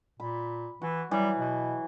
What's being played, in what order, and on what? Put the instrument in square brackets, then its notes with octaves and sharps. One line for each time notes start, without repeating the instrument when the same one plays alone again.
[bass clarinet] A#2 [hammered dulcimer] B5
[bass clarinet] E3 [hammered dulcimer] F#4
[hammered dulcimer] E3 F#3 [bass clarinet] G3
[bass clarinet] B2